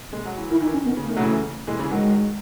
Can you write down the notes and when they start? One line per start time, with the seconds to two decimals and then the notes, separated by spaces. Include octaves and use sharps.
0.13 G#3
0.25 F#3
0.37 E3
0.50 D#3 E4
0.60 E3 D#4
0.67 D#3
0.73 C#4
0.85 D#3 B3
0.97 C#3
1.03 A3
1.09 D#3
1.17 F#3
1.20 C#3 E3
1.67 E3 G#3
1.79 C#3 E3
1.91 D#3 F#3 G#3